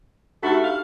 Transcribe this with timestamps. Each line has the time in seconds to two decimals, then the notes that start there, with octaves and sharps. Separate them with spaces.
0.43 A3 D4 D#4 F#4 G4 A4
0.64 F5